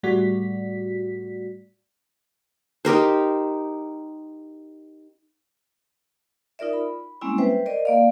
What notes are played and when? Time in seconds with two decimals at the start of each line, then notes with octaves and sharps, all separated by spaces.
0.03 A2 G3 A3 F#4 D5 B6
2.85 D#4 G4 A#4 C5
6.59 D#4 F4 A#4 D5 E5
6.73 B5
7.21 G3 G#3 A#3 C4 C#4 E4
7.38 B4 C5 E5 G5
7.66 A#4 C5 D5 D#5
7.85 A#3 D5 F5